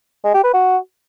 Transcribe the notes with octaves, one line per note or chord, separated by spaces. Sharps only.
G#3
G4
B4
F#4